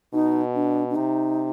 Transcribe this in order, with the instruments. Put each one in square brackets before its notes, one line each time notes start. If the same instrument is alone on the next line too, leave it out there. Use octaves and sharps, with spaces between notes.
[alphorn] B2 [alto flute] D#4
[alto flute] D4
D4
[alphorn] C3 [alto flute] D#4